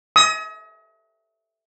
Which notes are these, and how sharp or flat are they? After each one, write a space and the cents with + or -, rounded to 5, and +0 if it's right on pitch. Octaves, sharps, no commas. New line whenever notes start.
D#6 +40